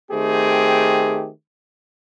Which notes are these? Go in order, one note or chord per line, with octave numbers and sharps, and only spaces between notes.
D#3 A3 C4 G4 G#4